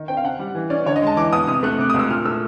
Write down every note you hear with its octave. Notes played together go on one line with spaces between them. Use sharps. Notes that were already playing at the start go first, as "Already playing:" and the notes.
Already playing: D#3
C4 G5
F5
C#3 F#5
G3
E3
C#4 D5
D3 C#5
D#5
G#3 A5
E3 D6
B3 D#6
C3 D#6
A3 F#6
C3 D6
C#2 D#6
E6
A#2 F6
A3 E6